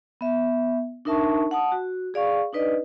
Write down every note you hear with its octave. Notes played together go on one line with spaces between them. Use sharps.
B3 E5
D4 D#4 A#4 E5 A5 C#6
F#5 A5 D#6
F#4
G#4 D5 F5 C#6
D4 D#4 B4 D5 D#5